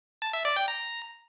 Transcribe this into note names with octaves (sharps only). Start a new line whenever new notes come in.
A5
E5
D5
G5
A#5